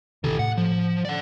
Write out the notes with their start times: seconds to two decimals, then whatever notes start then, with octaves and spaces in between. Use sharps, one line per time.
0.24 A1 C3 D#3 G4 A4
0.39 A2 F#5
0.58 F3
1.05 D5 F#5